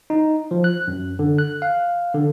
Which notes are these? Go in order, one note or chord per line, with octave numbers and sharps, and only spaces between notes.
D#4
F3
F#6
F#2
D3
F#6
F5
D3